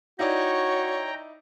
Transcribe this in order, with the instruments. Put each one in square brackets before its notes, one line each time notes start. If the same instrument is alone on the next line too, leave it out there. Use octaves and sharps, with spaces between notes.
[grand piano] D#4 E4 D5 [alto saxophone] F#4 [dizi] C#5 [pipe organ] G5 A#5